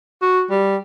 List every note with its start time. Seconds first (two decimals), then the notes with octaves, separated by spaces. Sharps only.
0.22 F#4
0.50 G3